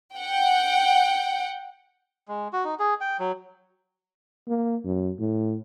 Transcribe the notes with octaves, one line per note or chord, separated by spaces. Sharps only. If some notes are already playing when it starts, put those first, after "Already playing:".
F#5 G5
G#3
F#4
D#4
G#4
G5
F#3
A#3
F#2
A2